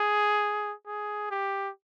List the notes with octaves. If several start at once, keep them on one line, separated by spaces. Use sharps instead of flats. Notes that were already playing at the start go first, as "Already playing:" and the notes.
Already playing: G#4
G#4
G4